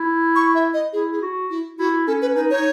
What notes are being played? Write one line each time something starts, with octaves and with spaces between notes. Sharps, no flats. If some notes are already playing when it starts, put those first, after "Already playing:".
Already playing: E4
C#6
E5
D#5
E4 G#4
G#4
F#4
E4
E4 F#4
C#4 A4
B4
D#4 B4
D#4 C#5